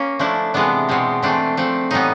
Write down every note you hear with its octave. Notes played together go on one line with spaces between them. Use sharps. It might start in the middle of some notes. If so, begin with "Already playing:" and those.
Already playing: A#3 C#4
F3 A3 D4 E4
C3 E3 G#3 B3 D4
B2 G#3 C4
E3 A3 C4 D4
F3 A3 C4
A2 E3 G3 B3 D#4